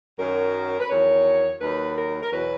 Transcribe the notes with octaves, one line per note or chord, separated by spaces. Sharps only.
F#2 D#3 F#3 A#4
B4
E2 D#3 F#3 C#5
D#2 D#3 F#3 B4
A#4
A#4
E2 B2 F#3 B4